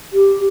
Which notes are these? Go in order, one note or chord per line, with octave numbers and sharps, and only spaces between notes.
G4